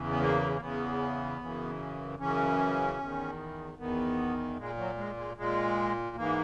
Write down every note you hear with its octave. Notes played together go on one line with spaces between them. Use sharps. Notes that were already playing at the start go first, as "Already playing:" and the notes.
Already playing: E2 C#3 E3
B3
A#3
A#3
E2 C#3 E3 B3
F#2 C#3 E3
F#2 C#3 E3 C#4
E2 D#3
E2 D#3 B3
A#2 G#3
F#3
G#3
G#3
A#2 G#3
G#2 E3 A#3